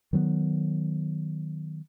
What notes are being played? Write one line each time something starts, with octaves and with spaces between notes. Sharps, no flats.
D#3 F#3 A3 B3